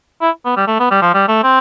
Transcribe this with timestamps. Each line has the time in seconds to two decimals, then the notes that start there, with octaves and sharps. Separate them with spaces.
0.22 E4
0.45 B3
0.57 G3
0.67 A3
0.80 B3
0.91 G3
1.02 F3
1.14 G3
1.28 A3
1.44 C4